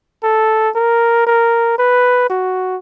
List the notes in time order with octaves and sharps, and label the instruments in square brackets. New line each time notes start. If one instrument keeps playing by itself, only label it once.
[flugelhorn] A4
A#4
A#4
B4
F#4